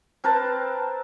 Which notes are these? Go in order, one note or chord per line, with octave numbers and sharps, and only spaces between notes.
C4 A#4 B4 A5